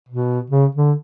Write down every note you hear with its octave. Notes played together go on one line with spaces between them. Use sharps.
B2
C#3
D3